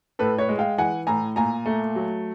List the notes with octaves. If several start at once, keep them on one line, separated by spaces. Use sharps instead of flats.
A2 A4 B4
B4 C#5
G#3
F5 G5
E3 F#5 G#5
A2 G#5 A#5
A#2 G#5 A#5
A3
F#3